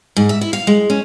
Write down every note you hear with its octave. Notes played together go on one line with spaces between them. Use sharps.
G#2
E5
E4
F5
G#3
C#4